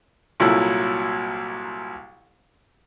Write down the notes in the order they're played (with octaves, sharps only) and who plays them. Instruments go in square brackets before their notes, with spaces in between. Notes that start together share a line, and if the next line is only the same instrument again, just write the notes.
[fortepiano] C2 A#2 F#3 E4 A4 E6